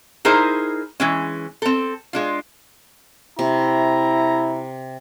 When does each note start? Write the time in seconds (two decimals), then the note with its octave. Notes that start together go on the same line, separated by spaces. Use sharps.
0.25 D#4 E4 G#4 A#4 C5
1.00 E3 G#3 C#4
1.62 C4 A4
2.13 G#3 D4 F4
3.39 C3 E4 A#5